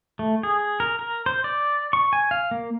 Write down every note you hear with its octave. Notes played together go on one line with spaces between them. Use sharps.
A3
G#4
A#4
A#4
C5
D5
C#6
G#5
F5
A#3